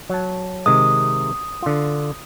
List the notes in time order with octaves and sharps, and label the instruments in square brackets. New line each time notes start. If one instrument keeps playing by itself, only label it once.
[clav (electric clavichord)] F#3 A5
[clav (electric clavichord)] C3 D#3 G#3 [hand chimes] D#6
[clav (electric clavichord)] D3 F4